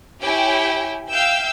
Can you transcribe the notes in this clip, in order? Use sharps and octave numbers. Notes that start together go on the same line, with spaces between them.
E4 G4 C#5 G5 G#5
E5 F5 G5 E6 G6